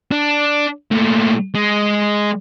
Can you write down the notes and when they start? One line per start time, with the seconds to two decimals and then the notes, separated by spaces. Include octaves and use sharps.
0.12 D4
0.92 A#2 A3
1.55 G#3